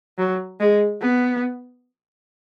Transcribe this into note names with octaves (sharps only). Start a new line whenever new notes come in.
F#3
G#3
B3